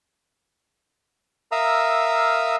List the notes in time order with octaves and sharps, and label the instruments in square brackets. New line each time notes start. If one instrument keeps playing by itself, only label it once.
[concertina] A#4 E5 F5 A#5 D#6 E6